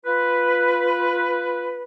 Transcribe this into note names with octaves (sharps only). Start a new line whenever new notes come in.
F4 B4